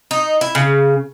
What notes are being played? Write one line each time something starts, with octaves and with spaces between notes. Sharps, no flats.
D#4
E4
C#3